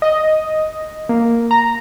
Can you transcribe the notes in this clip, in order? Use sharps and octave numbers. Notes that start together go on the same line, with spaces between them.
D#5
A#3
A#5